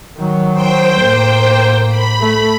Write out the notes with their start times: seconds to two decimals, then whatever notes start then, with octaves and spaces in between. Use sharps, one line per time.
0.17 D#3 F#3
0.53 C5 G5
1.00 A2 A#3
1.89 B5
2.20 A3